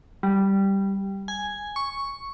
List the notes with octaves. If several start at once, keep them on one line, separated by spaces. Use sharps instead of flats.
G3
G#5
C#6